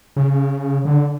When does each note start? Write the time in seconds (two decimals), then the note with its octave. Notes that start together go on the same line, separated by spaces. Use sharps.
0.16 C#3
0.85 D3